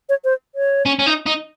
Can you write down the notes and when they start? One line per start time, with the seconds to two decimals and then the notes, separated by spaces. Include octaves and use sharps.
0.09 C#5
0.24 C5
0.55 C#5
0.86 C#4
0.99 C#4
1.06 D#4
1.26 D#4